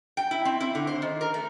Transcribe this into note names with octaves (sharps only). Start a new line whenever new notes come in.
G5
E4
C4
E4
D3
C5
D#3
A#4
A3